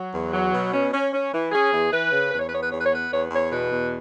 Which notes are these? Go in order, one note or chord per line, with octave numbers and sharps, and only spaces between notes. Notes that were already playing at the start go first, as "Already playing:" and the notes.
Already playing: F#3
E2
F#3
B2
C#4
C#4
C#4
E3
C#4 G#4
E2
E3 B4
C#3
E2 B4
C#5
B4
B3 C#5
B4
E2 C#5
B4
C#5
B3 B4
E2 C#5
E2 C#5
B2 B4
E2